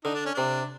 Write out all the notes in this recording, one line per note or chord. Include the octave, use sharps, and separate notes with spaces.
D3 D#4
D4
C#4
C3 D4